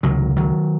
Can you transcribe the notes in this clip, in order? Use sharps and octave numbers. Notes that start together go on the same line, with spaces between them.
C#2 C3 D#3 F#3
D#3 F#3